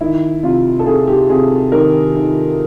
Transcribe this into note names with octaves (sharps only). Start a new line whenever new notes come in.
D#3 E4
C3 F4
A4
C3 G#4
G4
C3 G#4
D#3 A#4
D#3